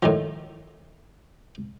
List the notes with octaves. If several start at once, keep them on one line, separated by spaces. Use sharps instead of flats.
A2 D#3 F3